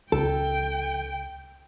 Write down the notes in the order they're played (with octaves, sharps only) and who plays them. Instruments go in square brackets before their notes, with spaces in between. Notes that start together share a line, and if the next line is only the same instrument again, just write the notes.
[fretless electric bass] C#2 [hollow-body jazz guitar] A4 [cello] G5